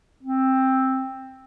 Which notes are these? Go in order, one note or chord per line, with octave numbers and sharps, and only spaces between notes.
C4